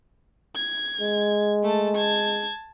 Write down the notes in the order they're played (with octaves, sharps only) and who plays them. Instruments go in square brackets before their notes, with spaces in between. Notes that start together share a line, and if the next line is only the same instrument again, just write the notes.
[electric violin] G#6
[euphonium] G#3
[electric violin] A3 A5
A5 G#6